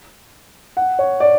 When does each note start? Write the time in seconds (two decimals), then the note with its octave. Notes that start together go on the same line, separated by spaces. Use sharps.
0.77 F#5
0.99 C#5
1.20 D5